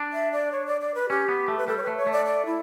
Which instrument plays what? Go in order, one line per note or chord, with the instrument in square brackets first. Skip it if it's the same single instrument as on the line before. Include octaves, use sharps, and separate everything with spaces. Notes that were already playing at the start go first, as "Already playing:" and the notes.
Already playing: [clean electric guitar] D4
[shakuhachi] E5
D5
C#5
D5
D5
B4
[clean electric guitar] C#4 [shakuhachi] G4
[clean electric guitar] B3
A3
[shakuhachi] B4
[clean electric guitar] G3 [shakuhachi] A4
[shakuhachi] C#5
[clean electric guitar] A3 [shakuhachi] B4
[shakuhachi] C#5
[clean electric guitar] A3
[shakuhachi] D5
D5
E4